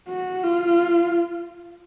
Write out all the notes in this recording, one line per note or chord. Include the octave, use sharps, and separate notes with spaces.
F#4
F4